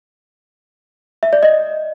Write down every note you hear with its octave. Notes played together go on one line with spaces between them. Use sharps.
E5
D5
D#5